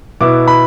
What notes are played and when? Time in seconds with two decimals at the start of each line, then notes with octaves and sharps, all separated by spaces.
0.21 B2 B3 E4 D6
0.48 B5